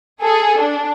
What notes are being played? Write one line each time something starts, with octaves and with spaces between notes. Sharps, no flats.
G#4 A4
D4